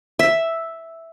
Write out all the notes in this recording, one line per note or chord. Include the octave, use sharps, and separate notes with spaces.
E5